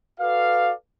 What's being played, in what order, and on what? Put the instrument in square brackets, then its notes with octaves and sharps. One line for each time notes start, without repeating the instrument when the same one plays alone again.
[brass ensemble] F#4 A4 B4 D5 F5